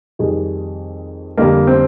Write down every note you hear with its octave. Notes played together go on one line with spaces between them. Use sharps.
F2 C3 D#3 G3 G#4
F2 D3 G3 A#3
C4